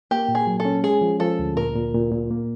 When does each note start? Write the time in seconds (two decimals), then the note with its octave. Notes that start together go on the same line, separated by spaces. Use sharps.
0.11 A#3 G4
0.28 A#2
0.35 G#4
0.47 F#3
0.60 A4
0.65 C#4
0.83 G#3 G#4
1.01 F3
1.20 F3 A4
1.39 D2
1.56 A#2 A#4
1.76 A#2
1.94 A#2
2.12 A#2
2.31 A#3